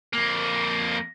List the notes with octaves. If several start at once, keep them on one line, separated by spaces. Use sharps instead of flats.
F2 A#3